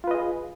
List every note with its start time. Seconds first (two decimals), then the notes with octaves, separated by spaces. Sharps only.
0.04 F4
0.07 B4
0.11 D#5
0.15 G#4